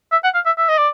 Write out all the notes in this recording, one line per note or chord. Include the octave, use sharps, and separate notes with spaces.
E5
F#5
F5
E5
E5
D#5
D5